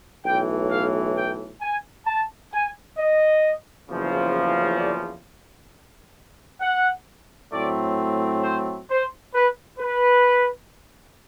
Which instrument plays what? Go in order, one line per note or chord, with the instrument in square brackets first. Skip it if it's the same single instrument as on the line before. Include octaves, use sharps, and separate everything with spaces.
[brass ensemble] B1 A2 E3 G5
F5
G5
G#5
A5
G#5
D#5
F#1 E2 C#3 F3
D5
F#5
A2 F#3 A3 C4 D5
C5
C5
B4
B4